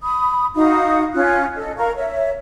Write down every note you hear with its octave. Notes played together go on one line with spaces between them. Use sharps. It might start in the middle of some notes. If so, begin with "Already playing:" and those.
B5 D#6
D#4 F#4 F5 D#6
C#4 F4 F#6
A4 D#5
A#4 F5 A#5 C#6
C#5 E5